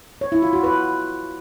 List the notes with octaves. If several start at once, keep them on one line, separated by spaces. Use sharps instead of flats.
C#5
E4
F4
F#4
B4